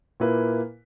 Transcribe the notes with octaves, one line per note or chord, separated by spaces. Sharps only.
A#2 A#3 E4 B4